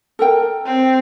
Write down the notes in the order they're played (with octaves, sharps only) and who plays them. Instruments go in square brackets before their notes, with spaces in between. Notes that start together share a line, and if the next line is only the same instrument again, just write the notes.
[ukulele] A4 A#4 G5
[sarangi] C4